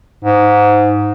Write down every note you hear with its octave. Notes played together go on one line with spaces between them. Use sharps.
G#2